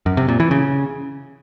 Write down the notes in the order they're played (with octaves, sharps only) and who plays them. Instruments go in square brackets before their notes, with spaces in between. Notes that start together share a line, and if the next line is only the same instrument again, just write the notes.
[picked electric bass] F#2
C3
A#2
E3
C#3